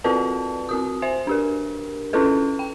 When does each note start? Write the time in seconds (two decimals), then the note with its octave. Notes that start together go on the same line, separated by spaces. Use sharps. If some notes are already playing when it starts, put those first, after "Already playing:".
0.04 C4 F4 F#4 B4 D5 A5
0.69 C4 F#4 D#6
1.02 C5 E5 G#5
1.27 D4 G4 A#4
2.13 C#4 E4 F4 A4 B4
2.59 G5